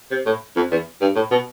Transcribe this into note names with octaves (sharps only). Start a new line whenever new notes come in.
C3
A2
F2
E2
G2
A2
B2